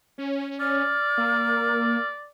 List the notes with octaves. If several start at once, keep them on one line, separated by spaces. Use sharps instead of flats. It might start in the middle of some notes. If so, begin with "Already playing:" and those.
C#4
D5 F6
A#3